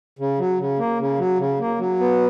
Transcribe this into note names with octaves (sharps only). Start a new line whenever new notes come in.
C#3
F#3
C#3
A#3
C#3
F#3
C#3
A#3
F#3
B3